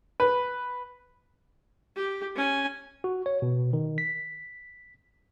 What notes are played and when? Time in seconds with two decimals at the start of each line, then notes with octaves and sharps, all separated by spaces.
0.20 B4
1.96 G4
2.36 C#4 G#5
3.04 F#4
3.26 C#5
3.42 B2
3.73 D#3
3.98 B6